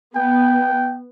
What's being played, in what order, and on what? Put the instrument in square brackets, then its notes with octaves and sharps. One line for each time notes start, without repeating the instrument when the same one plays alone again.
[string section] B3 [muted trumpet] G5